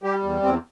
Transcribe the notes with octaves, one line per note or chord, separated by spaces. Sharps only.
G3 G4
E2
E2 C4